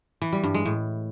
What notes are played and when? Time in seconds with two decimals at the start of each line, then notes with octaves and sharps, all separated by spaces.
0.22 E3
0.33 G3
0.44 G2
0.55 G#3
0.66 A2